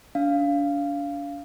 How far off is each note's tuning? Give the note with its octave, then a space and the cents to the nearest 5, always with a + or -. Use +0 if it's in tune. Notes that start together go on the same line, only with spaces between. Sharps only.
D4 -35 F5 -10